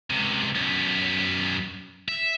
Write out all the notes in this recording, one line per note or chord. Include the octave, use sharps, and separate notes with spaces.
C#2 C3
F#2 B3
E5